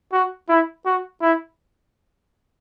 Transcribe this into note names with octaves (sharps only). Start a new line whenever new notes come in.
F#4
E4
F#4
E4